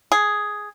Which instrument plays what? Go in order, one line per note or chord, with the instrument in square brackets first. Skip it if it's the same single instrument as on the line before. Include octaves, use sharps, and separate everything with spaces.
[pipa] G#4